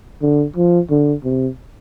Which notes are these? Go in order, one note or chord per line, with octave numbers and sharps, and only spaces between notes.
D3
F3
D3
C3